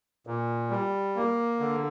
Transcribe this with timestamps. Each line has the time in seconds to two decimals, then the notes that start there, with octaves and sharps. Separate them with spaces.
0.27 A#2
0.70 G3
1.16 A#3
1.60 D3